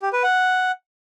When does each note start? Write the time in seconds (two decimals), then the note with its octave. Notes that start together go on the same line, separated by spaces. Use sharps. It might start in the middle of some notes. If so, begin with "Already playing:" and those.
0.02 G4
0.13 B4
0.24 F#5